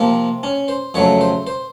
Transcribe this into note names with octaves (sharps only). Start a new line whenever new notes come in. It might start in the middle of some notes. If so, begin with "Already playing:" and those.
Already playing: C3 F3 A#3 C4
C#4
C5
F2 C#3 F#3 A3 C#5
C5
C5